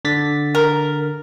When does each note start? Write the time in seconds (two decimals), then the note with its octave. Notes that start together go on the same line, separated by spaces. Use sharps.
0.05 D3 A6 B6
0.55 A#4